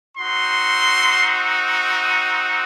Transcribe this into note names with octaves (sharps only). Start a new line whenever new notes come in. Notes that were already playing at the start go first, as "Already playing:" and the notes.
C4 D#4 F#4 C6
D#6